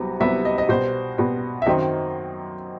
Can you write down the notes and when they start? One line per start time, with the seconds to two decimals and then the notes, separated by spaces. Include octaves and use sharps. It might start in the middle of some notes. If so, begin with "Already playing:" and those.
Already playing: C2 C3 F#3 B3
0.20 C2 C3 F#3 B3 E5
0.45 D#5
0.58 D#5
0.69 B2 G3 B3 C5
1.18 B2 G3 B3
1.62 E5
1.66 F#2 D#3 F#3 C4 D#4 D#5